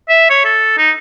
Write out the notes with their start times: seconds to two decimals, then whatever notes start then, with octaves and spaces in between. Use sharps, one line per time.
0.09 E5
0.30 C#5
0.45 A4
0.78 D#4